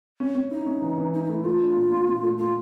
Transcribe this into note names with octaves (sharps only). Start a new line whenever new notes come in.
C#4
C#4
D#4 E4
C#4
E3
E3
D#4 E4
D#4
A3
E4
A3 F4
D4
A#2
A#2
A#2
A3
A3 F4